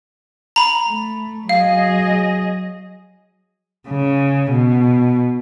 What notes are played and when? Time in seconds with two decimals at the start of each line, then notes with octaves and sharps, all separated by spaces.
0.56 A#5 B5
0.87 A3
1.49 F#3 G#4 D#5 F5
3.89 C#3
4.51 B2